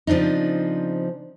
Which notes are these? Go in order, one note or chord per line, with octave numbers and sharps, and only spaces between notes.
C#3 F3 C4 D4 D#4